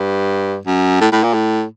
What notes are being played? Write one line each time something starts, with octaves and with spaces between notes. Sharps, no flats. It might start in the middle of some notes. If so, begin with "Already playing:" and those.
Already playing: G2
F#2
A2
A2
A#2
A2